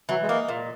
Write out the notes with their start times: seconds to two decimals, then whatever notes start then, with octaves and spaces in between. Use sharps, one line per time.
0.09 E3 F#3
0.23 G#3
0.29 A#3 D#4
0.49 A#2